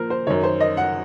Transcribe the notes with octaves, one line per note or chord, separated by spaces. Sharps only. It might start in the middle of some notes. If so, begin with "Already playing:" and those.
Already playing: A#2 F3 A#4 C5
C5
F#2 D#3 C#5
C5
D#5
F#5